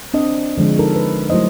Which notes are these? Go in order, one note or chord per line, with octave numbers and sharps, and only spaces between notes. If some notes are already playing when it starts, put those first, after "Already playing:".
C4 D4 D#5
D3 F3 G#3 D4
D#4 A4 A#4
B4
F#3 A3 E4 C5 D#5